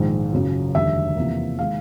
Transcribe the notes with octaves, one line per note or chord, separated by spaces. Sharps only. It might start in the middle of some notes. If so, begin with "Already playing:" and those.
Already playing: A#1 G#2 D#3 G#3
F#1 F#2 C#3
F1 D#2 D3 G3 E5
E2 C3 F3 A#3
D#3 G#3 F5